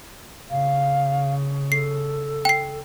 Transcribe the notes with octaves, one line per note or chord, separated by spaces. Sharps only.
C#3 F5
A4 C7
G5 C7